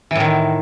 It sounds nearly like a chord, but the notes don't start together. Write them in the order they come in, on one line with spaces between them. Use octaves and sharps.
E3 A2 D#3